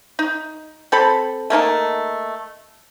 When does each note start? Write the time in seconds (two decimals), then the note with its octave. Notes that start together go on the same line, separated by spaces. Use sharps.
0.19 D#4
0.92 C4 A4 B5
1.50 A3 A#3 D#4 A5